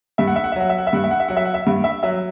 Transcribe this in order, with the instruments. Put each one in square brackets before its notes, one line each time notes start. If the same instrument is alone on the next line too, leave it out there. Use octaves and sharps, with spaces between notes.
[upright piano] G2 E5
F#5
E5
F#5
E5
F#3 F#5
E5
F#5
E5
G2 F#5
E5
F#5
E5
F#3 F#5
E5
F#5
E5
G2
E5
F#3 E5